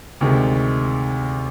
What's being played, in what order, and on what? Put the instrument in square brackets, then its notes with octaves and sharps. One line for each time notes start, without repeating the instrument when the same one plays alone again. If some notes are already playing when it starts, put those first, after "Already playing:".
[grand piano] D2 C3 D#3 G#3